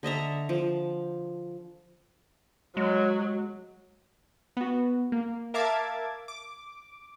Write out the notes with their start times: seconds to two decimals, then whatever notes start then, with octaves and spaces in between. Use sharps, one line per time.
0.03 D3 D#5 E5 A#5
0.49 F3
2.77 F#3 G#3
4.57 B3 F#4
5.12 A#3
5.54 A#4 E5 F5 A5 D6 G#6
6.28 D6